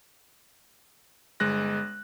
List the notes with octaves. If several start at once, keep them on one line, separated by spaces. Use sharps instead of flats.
G1 G#3 F#6 A#6